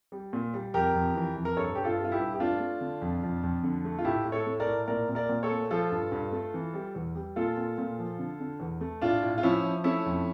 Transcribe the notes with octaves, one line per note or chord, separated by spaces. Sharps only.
G3
A#2
G3
F2 G4 A#4
F2
E3
F2
A#4
G2 A4 C#5
G2 G4
F4 A4
G3
F4
E4 G4
G2
G4
A3 D4 F4
A3
D3
F2
F2
F2
D3
A3
F4
A2 E4 G4
A2
A4 C#5
A3
A#4 D5
A2
A#2 A#4 D5
A#2
A#4 D5
A#2
A4 C#5
A3
F3 F4 A4
G2
G2
A3
E3
G3
E2
G3
A#2 F4 A4
A#2
A#2
F3
D3
D3
E2
A3
A2 D4 F4
A2
F4
F3 C#4 E4
F3
A3 C#4 E4
F2